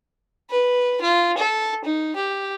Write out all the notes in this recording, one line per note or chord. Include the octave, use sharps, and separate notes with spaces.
B4
F4
A4
D#4
G4